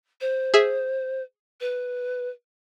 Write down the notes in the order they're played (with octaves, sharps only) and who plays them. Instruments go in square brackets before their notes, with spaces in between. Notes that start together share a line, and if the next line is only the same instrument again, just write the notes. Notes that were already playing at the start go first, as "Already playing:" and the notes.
[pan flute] C5
[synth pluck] G#4 E5
[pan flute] B4